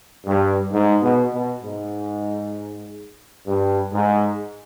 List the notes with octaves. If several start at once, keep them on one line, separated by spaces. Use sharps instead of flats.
G2
G#2
B2
B2
G#2
G2
G#2